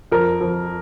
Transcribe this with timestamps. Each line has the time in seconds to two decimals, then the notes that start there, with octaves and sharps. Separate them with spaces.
0.12 F2 A#4
0.41 F2